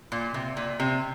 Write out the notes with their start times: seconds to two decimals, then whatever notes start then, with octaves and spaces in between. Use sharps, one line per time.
0.12 A#2
0.34 C3
0.57 A#2
0.80 C3